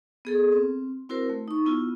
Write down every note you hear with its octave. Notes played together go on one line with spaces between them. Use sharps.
B3 G#4 A4
C4
C4 E4 F#4 A#4 C5
A3
D#4 C#6
B3 E4 F4